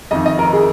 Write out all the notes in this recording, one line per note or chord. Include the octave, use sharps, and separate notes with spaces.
F2 D#3 D#5
D#5
A#4
G#4